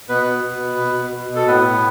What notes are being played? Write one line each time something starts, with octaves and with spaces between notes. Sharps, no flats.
B2 B3 B4
B2
B2
B2
B2
B2
B2
B2
A4
A2 B3 B4
A2